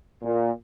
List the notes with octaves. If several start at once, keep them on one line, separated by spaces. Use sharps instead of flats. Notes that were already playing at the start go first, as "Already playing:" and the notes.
A#2